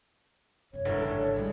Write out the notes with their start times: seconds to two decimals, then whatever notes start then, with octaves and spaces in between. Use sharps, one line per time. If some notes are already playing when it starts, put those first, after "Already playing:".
0.73 F#2 C3 C#5
0.85 G#1 C#2 G2 D3 E3 A#4
1.01 D4 A4
1.36 B1 G3 G#3